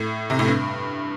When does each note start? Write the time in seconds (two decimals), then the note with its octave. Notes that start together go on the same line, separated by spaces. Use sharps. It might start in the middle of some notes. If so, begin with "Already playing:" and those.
Already playing: A2
0.30 C3
0.39 A2
0.47 G2